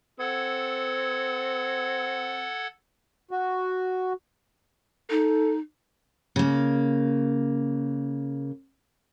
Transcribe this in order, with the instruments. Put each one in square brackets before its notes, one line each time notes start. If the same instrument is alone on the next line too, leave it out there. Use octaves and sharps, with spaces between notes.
[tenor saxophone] C4 [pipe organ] A4 F#5 G#6
[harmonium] F#4
[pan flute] D#4 [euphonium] A4
[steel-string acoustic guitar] C#3 A#3